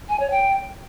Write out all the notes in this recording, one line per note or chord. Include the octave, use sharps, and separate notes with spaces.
G#5
C#5
G5